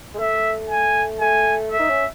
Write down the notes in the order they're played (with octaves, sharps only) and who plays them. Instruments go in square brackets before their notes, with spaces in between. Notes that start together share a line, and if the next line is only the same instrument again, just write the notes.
[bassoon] G#3
[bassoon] A3 [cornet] E5
[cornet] G#5
[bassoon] A3 [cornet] G#5
[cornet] E5
[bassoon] D#4
C#4